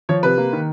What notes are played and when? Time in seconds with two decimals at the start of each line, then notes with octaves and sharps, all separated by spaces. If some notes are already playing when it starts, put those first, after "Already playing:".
0.09 F3 C#5
0.23 C3 B4
0.38 A#3
0.53 D#3